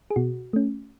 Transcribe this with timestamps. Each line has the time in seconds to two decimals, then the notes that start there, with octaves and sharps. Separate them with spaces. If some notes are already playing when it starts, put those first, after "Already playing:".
0.10 G#4
0.16 B2 F#4
0.53 A3 C#4